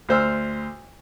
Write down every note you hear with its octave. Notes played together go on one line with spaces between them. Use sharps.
D2 C5 E6 F6